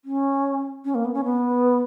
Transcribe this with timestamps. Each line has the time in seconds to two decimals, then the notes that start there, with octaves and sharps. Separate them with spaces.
0.05 C#4
0.85 C#4
0.95 A#3
1.05 B3
1.14 C#4
1.24 B3